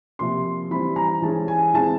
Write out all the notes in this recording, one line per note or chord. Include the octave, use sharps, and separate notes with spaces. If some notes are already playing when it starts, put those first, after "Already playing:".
C3 F3 A#3 C6
E3 G3 C4 B5
A#5
E3 G#3 C#4 A5
G#5
E3 G#3 C4 A5